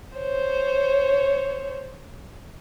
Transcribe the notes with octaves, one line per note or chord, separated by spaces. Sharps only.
C5 C#5